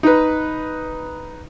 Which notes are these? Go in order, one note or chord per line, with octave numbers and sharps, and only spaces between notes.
D#4 B4